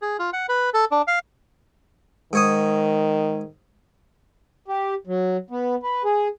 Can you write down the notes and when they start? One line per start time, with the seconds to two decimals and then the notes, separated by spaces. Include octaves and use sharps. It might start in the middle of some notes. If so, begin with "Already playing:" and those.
0.02 G#4
0.19 F4
0.33 F#5
0.49 B4
0.74 A4
0.91 D4
1.07 F5
2.33 G#2 D#3 C#5 D#6
4.68 G4
5.07 F#3
5.50 B3
5.83 B4
6.04 G#4